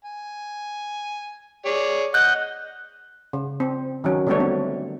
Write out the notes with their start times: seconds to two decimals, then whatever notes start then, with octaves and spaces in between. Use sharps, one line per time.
0.05 G#5
1.65 G#4 C#5 D5
2.14 D#5 F#5 F#6 G6
3.33 C#3
3.60 C4
4.04 D#3 F#3 C#4
4.27 D3 G3 A3 B3 D4 C#5
4.40 C4